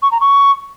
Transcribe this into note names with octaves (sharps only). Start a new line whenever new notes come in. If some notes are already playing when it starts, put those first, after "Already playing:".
C#6
A#5
C#6